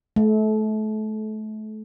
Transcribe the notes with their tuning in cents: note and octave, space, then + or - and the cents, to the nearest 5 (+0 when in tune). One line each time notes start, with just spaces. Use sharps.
A3 -30